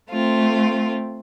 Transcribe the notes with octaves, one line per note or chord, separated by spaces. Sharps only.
A3 C4 F4